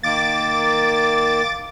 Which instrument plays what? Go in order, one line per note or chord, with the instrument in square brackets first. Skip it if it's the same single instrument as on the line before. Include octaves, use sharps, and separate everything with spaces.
[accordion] D#3 A#3 [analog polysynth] D6 A6